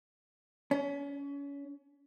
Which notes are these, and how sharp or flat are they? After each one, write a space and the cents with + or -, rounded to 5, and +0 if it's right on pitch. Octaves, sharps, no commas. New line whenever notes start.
C#4 +30